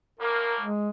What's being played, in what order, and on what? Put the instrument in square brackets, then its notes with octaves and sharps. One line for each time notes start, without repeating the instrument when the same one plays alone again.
[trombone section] A#1 A2 A#3 [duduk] A#4
[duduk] G#3